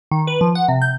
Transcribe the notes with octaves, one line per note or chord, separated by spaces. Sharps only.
D#3
B4
F3
F#5
C3
G6